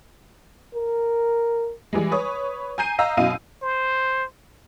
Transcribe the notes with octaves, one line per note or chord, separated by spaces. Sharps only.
A#4
E3 G3 G#3
B4 C#5 D#6
G#5 A#5 G6 C7 D#7
D#5 F5 A#5 E6
F#2 B2 E4 D#5 F5 D#7
C5